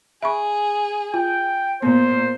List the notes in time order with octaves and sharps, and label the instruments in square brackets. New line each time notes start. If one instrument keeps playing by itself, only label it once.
[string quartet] G#4 [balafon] E5 B5 C#6
[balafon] F4 [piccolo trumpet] G5
[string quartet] A#2 [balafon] B3 [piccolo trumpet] C5